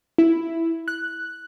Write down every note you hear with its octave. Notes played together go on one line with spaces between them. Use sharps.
E4
F#6